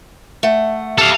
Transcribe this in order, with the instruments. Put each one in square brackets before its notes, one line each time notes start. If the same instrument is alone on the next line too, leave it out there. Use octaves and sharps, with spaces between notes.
[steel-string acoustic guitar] A3 F#5
[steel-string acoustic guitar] G4 [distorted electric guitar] A4 F5